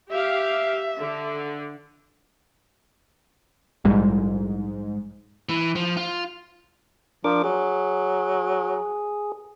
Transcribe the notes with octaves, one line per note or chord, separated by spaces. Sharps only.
G4 E5 F5
D3
A#1 G#2 G3
E3
F3
F4
F3 D4 A#4 D6
F#3 G#4